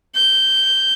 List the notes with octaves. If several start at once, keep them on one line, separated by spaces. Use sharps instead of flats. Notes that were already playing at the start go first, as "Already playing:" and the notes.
G6